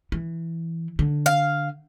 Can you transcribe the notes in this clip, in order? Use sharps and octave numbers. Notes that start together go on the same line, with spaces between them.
E3
D3
F5